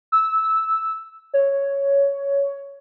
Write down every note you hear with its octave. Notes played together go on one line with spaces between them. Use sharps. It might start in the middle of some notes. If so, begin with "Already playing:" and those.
E6
C#5